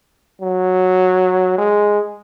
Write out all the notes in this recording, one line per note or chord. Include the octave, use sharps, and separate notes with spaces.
F#3
G#3